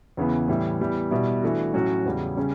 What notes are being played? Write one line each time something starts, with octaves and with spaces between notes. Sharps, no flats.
E2 C#3 E3 B3
A2 E3 G3
E3 G3 B3
B2 G3 B3 E4
E3 A3 D4 F#4
A2 F#3 C#4 F#4
E2 C#3 G3
C#3 G3 C#4